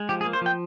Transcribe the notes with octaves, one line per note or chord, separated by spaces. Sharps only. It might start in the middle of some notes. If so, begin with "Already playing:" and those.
Already playing: G#3
F3 G4
G#4
A#3
C5
F3 G5